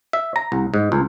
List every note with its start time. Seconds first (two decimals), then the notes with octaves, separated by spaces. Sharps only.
0.13 E5
0.36 A#5
0.52 C2
0.74 G#2
0.92 C#2